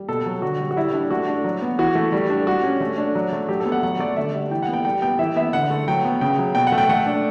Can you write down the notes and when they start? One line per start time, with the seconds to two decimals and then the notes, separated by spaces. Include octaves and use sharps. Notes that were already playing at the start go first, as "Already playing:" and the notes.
Already playing: G3
0.09 B2 A4
0.26 F#3
0.42 D3 F#4
0.60 G3
0.71 F#4
0.76 G3 E4
0.94 D4
1.10 A3 F#4
1.28 D4
1.44 F#3
1.62 B3
1.79 E3 F#4
1.95 A3
2.12 G3
2.30 D4
2.47 G3 F#4
2.63 C#4
2.81 A3
2.98 D4
3.15 F#3
3.32 A3
3.49 F#3 G4
3.60 A4
3.65 B3
3.72 F#5
3.83 F#3 F#5
3.99 A3 D5
4.16 D3 E5
4.34 G3
4.51 E3 G5
4.63 F#5
4.68 B3
4.73 G5
4.85 G3 G5
5.02 B3 G5
5.19 E3 E5
5.36 B3 E5
5.53 D3 F#5
5.70 A3
5.88 F#3 G5
6.04 B3
6.21 C#3 G5
6.39 F#3
6.55 B2 G5
6.67 F#5
6.72 A3
6.78 G5
6.89 A3 F#5
7.06 D4